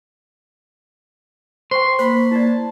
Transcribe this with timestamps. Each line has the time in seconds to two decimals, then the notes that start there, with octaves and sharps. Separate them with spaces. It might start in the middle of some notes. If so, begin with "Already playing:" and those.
1.71 C5 G5 C6 C#6
1.99 A#3 C5 B5
2.31 E4 D5 A5